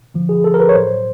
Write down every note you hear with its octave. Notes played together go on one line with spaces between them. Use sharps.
G2 D3 F3
G#4
A4
A#4
B4
C#5
A2 F#3 C5